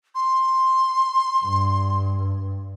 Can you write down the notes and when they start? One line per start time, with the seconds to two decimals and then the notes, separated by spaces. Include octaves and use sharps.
0.15 C6
1.45 G2